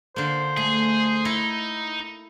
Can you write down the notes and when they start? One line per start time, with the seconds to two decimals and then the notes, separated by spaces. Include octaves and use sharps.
0.16 D3 A#3 C5
0.57 A3 G#4
1.25 D#4 E4